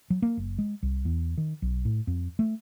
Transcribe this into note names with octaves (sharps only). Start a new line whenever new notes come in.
F#3
A#3
F#1
G#3
C2
E2
D#3
B1
A2
F2
A3